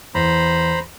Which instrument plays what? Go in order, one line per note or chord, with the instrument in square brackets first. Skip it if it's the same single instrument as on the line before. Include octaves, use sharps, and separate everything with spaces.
[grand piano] E2 [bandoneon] C5 A#5 B5